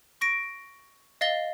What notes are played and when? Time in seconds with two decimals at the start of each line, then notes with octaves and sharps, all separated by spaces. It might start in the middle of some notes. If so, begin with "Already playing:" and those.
0.21 C#6 A#6 D7
1.21 D#5 F5 A6 G7